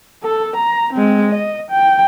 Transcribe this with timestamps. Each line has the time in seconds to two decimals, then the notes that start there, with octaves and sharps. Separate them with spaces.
0.23 A4
0.56 A#5
0.93 G#3 C4
1.32 D#5
1.71 G5